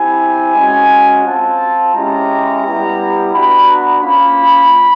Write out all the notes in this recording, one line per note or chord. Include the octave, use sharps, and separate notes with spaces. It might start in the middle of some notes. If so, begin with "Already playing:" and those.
Already playing: C4 E4 G4 G#5
G#3 C#4 F#4
C4 F4 A5
G#3 C#4 E4 G4 A#5
G3 B3 E4 G4
B3 D4 F#4 B5
A#5
A#3 C#4 F4 B5